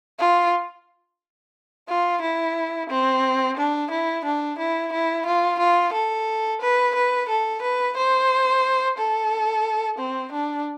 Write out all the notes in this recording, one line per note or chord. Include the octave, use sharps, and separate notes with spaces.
F4
F4
E4
C4
D4
E4
D4
E4
E4
F4
F4
A4
B4
B4
A4
B4
C5
A4
C4
D4